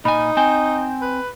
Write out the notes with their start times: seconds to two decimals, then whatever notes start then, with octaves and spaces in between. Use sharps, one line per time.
0.05 A#2 D#4 G#5 B5
0.37 C4 G5 G#5
1.01 B4